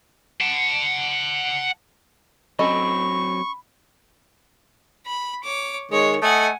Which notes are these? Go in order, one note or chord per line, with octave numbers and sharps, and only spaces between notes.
F#5 A5
F#3 C4 C#4 A4 D#5 B5 C#6
B5
C#5 D6
D#3 G#3 C#5
A3 D#5 F#5 G#5